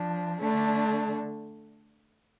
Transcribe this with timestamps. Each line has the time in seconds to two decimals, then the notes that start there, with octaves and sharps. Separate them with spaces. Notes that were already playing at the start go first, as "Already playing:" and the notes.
Already playing: F3 D4
0.40 D3 A3 D4